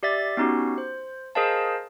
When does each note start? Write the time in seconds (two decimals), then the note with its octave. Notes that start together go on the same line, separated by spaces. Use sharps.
0.03 G4 D5 E5 A6
0.37 B3 C#4 D#4 F#4 G4
0.78 C5
1.35 G#4 A#4 C5 D#5 F5 A5